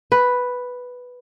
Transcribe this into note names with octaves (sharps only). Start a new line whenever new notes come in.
B4